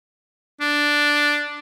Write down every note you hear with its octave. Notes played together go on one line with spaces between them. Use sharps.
D4